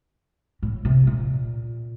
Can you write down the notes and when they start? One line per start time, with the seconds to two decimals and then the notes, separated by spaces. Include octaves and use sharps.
0.63 A2
0.85 C3
1.07 A#2